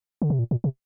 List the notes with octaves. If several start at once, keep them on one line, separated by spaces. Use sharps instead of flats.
D3
C3
A#2
A#2
C3